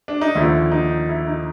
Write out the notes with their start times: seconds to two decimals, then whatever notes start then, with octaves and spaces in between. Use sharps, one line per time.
0.08 D4
0.21 D#4
0.35 D#2 D3 F3 E4
0.71 D#4
1.09 E4
1.27 D#4